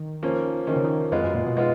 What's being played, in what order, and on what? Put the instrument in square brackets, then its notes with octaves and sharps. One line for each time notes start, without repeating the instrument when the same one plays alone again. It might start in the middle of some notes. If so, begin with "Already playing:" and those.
Already playing: [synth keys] D#3
[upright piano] F3 A#3 C#4
[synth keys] D#3 [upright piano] F3 A#3 C#4
[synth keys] C#3
D#3
[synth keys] F2 [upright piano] G#3 B3 F4 B4
[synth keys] F#2
A#2
B2
[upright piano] G#3 B3 F4